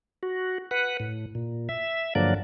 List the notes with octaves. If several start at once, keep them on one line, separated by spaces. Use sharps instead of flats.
F#4
B4 F#5
A2
A#2
E5
G2 D3 F3 F#3 A#3 D5